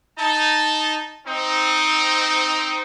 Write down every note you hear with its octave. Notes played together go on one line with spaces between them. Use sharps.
D#4 A5
C4 D#4